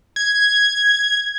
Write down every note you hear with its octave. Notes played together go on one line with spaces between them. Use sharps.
G#6